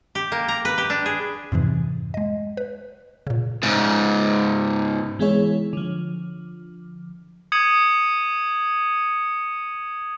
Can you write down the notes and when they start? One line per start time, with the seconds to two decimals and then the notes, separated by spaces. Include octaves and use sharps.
0.15 G4
0.32 A#3
0.48 A#5
0.65 B4
0.78 G4
0.90 D4
1.06 G#4
1.52 F2 G#2 C3 E3
2.14 G#3 D#5
2.57 B4
3.27 A#2 C#3
3.63 G#2 C#3
5.19 E3 G#3 B3 E4 G#4 C#5
5.73 D3 F3
7.52 D#6 G#6 C#7 D#7 F#7